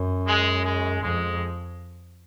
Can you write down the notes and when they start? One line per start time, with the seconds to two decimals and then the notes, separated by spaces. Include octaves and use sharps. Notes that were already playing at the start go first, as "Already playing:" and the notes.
Already playing: F#2
0.27 G#3
0.65 G#3
1.03 F2 G#3